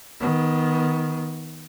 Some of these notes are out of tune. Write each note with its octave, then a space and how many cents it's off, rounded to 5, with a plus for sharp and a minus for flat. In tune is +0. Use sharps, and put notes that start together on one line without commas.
D#3 +20 B3 +0